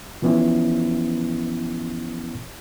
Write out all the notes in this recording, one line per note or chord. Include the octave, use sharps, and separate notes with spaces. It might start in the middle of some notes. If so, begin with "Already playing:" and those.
E3 F3 B3 C#4 E4